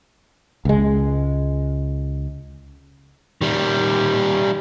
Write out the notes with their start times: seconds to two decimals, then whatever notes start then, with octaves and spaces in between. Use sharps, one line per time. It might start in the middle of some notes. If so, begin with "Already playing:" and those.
0.65 C#2 G#3
3.41 D#3 G3